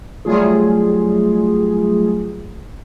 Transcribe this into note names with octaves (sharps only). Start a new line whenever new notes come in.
F#3 G3 A3 F4 G#4